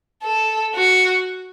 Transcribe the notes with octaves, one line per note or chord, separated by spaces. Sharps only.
A4
F#4